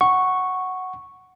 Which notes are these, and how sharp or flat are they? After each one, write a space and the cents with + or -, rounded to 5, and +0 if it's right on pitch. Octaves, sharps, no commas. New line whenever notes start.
F#5 +0 C#6 -5